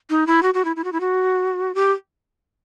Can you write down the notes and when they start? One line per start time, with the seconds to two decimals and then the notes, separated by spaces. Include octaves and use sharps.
0.10 D#4
0.27 E4
0.43 F#4
0.54 F#4
0.65 E4
0.76 E4
0.84 F#4
0.92 E4
1.00 F#4
1.75 G4